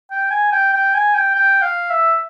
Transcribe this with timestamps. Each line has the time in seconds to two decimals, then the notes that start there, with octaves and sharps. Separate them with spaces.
0.11 G5
0.31 G#5
0.52 G5
0.73 G5
0.94 G#5
1.14 G5
1.35 G5
1.62 F5
1.90 E5